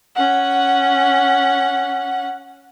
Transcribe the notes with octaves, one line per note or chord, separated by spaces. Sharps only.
C#4 F#5